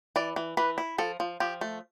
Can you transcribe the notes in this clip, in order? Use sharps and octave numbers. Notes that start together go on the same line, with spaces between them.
E3 D5
E3
E3 B4
E4
F3 A4
F3
F3 G4
A3